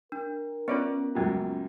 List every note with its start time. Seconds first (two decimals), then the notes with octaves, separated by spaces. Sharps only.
0.12 D4 A#4
0.68 B3 C#4 F4 B4 C#5 D5
1.15 C#2 F#2 A#2